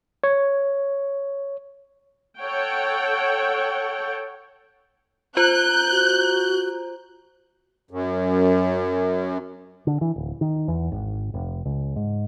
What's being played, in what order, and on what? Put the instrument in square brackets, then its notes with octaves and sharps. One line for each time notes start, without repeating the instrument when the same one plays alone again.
[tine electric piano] C#5
[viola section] A4 C#5 F#5 G5
[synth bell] F4 C5 A#5 [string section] F#6 G6
[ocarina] F#4
[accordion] F#2
[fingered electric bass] D3
E3
D1
D#3
E2
G#1
F1
C#2
G#2